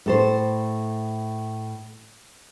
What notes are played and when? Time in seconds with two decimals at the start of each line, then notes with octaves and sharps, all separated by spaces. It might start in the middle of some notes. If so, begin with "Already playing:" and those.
0.06 A2 A4 C5